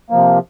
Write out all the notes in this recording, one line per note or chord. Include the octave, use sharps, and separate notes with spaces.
C3 F3 A#3